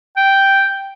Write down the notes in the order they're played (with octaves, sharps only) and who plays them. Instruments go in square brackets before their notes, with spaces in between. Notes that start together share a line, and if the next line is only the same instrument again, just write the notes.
[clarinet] G5